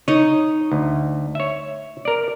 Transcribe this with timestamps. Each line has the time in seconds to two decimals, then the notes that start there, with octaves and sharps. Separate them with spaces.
0.08 D#4 C#5 D#5
0.72 D2
1.35 C#5 E5
2.05 A#4 D5